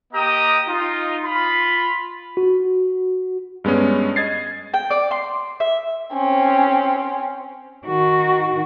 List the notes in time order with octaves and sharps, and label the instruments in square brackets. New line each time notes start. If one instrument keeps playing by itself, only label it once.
[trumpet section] A#3 G4 D#5 G5 A#5 D#6
D#4 F4
F4 B5
[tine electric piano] F#4
[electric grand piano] G2 G#3 B3 C#4
D#5 G#6 A6 C7
[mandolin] G5
D5
C6
E5
[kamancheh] C4 C#4
[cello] D#3 F#4